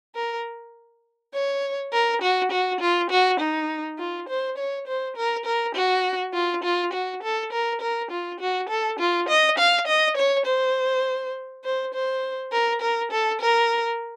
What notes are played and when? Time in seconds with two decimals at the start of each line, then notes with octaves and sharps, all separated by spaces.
0.15 A#4
1.33 C#5
1.93 A#4
2.22 F#4
2.51 F#4
2.80 F4
3.10 F#4
3.40 D#4
3.98 F4
4.28 C5
4.58 C#5
4.87 C5
5.16 A#4
5.45 A#4
5.75 F#4
6.34 F4
6.63 F4
6.93 F#4
7.23 A4
7.52 A#4
7.81 A#4
8.11 F4
8.40 F#4
8.69 A4
8.99 F4
9.28 D#5
9.58 F5
9.87 D#5
10.17 C#5
10.46 C5
11.64 C5
11.94 C5
12.52 A#4
12.81 A#4
13.11 A4
13.41 A#4